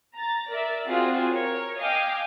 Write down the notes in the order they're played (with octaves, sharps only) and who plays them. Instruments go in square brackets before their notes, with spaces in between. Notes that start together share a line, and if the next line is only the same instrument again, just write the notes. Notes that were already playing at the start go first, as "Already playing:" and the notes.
[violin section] A#5 A6
A#4 D5 E5
C4 F4 F#4 G#4
A#4 C#5
D#5 F5 G5 G#5 D6